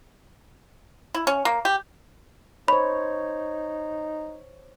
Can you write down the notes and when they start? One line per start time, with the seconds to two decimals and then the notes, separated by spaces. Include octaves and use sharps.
1.14 E4
1.27 C#4
1.45 A#3
1.65 G4
2.68 D#4 C5 C#5 B5